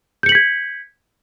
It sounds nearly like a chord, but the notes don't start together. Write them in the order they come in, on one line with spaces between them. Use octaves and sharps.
G6 C#7 F#7 B6 G#6